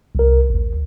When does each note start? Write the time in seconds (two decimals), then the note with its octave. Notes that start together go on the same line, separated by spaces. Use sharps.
0.15 C2 A#4
0.50 A1 D2